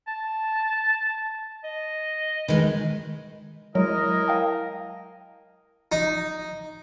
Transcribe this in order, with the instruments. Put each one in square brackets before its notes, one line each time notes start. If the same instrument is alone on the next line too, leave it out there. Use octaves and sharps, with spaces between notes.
[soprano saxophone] A5
D#5
[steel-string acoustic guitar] D#3 G#3 D#4 [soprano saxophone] B4
[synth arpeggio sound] F#3 G#3 [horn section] E4 A#4 D#5
[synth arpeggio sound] F5 G5 A5
[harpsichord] D#4